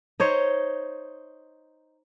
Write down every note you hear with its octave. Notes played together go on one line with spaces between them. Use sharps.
D#4 C5 C#5